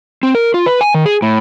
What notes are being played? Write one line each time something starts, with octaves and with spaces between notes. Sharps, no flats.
C4
A#4
F4
B4
G#5
D#3
G#4
A2